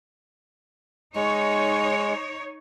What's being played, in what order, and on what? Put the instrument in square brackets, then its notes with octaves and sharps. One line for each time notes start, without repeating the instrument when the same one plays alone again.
[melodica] G#3 [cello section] D#4 C#5